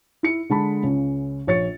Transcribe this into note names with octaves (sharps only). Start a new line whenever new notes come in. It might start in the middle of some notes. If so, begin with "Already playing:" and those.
E4 C#7
D3 G#3 A5 B5
C#2 C#3
A#1 C#5 A6 C#7